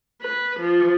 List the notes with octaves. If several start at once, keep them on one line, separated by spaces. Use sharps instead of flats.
B4
F3